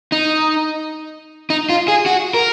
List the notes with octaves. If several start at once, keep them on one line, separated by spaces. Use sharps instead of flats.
D#4
D#4
F4
G#4
F#4
A#4